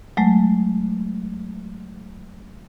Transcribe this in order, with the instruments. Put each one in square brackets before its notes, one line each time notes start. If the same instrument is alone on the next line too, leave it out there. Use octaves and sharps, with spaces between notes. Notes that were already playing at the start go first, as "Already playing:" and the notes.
[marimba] F#3 G#3 A3